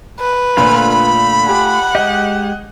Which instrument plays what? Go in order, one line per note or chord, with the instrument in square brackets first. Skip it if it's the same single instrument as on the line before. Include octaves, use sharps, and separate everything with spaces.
[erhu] B4
[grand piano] A#1 A#2 D3 [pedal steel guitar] A3 F4 [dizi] B5
[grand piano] G4 G#5 [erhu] F#5
[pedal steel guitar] G#3 G4 [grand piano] D#5